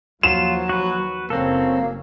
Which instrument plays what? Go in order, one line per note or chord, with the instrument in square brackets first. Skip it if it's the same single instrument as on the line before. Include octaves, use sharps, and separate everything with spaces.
[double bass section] D#2 D#3 F3 [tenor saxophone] F#3 [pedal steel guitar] F4 [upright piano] E7
[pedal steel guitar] F#4 B4
[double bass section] F#1 F#3 C#4 [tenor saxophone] A#3 [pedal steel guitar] C4 A4